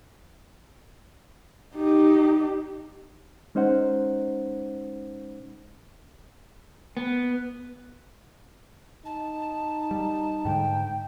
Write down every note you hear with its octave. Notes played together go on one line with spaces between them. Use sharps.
D#4 G4
G#3 C#4 D#4 C5 F#5
B3
D#4 A5
G3
G#2 D3 G#3 G5